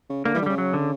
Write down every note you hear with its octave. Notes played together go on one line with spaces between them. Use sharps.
C#3
D3 A#3
E3 G3
D3
C#3 G3
F#3
D3